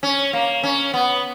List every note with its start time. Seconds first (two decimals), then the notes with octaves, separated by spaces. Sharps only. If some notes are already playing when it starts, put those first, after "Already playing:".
0.03 C#4
0.33 A#3
0.63 C#4
0.94 B3